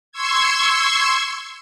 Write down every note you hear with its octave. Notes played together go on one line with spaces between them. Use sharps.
C6 C#6 E6 G#6